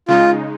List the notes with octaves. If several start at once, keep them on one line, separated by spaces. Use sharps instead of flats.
C#3 G#3 D#4 F4